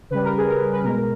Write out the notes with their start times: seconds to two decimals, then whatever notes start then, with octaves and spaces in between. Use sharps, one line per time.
0.11 C#3 G3 B4
0.24 A#4
0.37 G#4
0.49 A#4
0.73 B4
0.83 B2 G#3 A#4